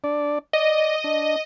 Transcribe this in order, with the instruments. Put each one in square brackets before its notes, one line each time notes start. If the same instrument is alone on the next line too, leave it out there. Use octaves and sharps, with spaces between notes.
[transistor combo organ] D4 D5
[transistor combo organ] D5 [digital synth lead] D#5
[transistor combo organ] D4